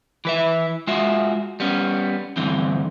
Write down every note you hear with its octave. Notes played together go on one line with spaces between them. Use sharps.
E3 B4 E5
G#3 F4 F#4 E5
G3 B3 C#4
D2 G2 D3 E3 C4